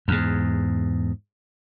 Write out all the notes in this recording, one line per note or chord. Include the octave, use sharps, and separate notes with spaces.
E2 G#2